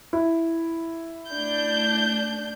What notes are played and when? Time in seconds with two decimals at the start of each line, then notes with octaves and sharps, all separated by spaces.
0.13 E4
1.31 A3 D4 G6